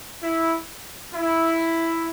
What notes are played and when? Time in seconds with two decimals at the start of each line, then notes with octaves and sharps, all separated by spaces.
0.22 E4
1.14 E4